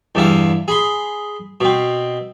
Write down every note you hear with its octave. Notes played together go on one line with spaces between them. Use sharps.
E2 G2 E4 F5
G#4 B5 C6
B2 C4